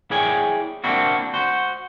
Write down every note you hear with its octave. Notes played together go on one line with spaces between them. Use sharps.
E4 G#4 C#5 D5 G5 G#5
A#3 C4 D4 E4 F#4
F#4 C5